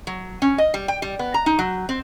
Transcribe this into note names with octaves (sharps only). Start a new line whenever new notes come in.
F#3
C#4
D#5
G3
G5
G3
B3
A#5
D#4
F#3
C4